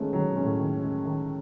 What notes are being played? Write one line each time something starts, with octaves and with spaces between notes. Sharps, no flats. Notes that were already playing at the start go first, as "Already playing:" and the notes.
Already playing: D#3 G#3 A3 B3 C#4
D#3 F#3
B2
G#3 C#4
A2
D#3
G#3 C#4
D#3